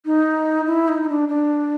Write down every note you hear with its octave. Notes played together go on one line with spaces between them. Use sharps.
D#4
E4
D#4
D#4
D4
D4